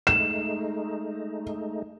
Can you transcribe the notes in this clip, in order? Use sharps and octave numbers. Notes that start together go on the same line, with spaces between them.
G#3 A3 D#4 E7